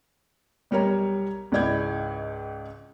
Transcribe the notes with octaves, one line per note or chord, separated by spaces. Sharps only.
B1 G3 A#4 C#5 A#5
C#2 G#2 E4 D5 G6 G#6